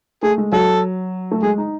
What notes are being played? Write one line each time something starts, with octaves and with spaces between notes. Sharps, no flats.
A3 G#4
G#3
F#3 A4
A3
G#3 G#4
D#4